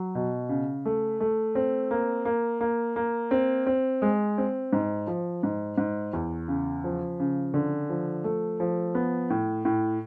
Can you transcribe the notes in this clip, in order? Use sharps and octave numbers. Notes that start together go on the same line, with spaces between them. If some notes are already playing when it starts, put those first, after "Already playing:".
Already playing: F#3
B2
C#3
A3
A3
C4
A#3
A#3
A#3
A#3
C4
C4
G#3
C4
G#2
F3
G#2
G#2
E2
C#3
F3
C#3
D3
F3
A3
F3
B3
A2
A2